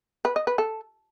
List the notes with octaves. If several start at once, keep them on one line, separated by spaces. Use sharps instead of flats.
B4
D#5
B4
A4